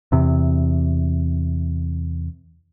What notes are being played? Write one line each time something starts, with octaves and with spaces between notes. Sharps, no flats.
E2 C3